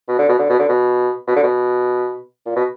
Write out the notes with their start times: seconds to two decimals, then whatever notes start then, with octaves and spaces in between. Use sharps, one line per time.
0.08 B2
0.19 D3
0.29 B2
0.39 D3
0.50 B2
0.60 D3
0.69 B2
1.27 B2
1.36 D3
1.44 B2
2.46 A#2
2.56 B2